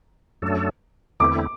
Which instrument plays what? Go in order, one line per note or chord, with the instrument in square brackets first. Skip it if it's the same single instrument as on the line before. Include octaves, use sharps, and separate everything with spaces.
[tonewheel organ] F#2 F#3 A3 D4 A4
[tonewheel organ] E2 D3 A3 C4 E4 [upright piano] D6